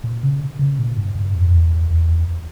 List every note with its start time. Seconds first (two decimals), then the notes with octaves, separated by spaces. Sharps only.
0.04 A#2
0.23 C#3
0.59 C#3
0.79 A#2
0.97 G2
1.15 G2
1.35 F2
1.53 E2
1.91 E2